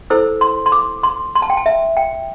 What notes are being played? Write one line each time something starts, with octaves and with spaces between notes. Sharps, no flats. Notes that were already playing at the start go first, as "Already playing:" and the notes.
E4 A4 C5 E6
C6
C6
D6
C6
C6
A5
G5
A5
E5
G5